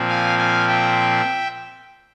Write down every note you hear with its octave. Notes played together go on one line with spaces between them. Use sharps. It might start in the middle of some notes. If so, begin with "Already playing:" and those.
Already playing: A#2 F3 C4
F5 G#5
F5 G#5
E5 G5